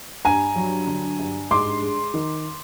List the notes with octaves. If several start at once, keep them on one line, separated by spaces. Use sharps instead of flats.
G2 G#5 A#5
F#3
D3
G2
G#2 C6 D6
G#3
D#3